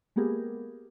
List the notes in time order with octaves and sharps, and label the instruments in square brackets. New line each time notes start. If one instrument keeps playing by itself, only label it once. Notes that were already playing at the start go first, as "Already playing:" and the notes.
[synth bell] G#3 A#3 B3 G4 G#4 A#4